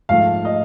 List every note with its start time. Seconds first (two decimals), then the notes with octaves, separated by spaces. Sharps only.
0.09 G#2 F3 A3 F5
0.45 D#5